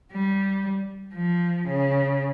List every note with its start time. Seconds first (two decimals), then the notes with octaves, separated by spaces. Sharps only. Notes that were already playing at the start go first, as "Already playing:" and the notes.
0.11 G3
1.14 F3
1.66 C#3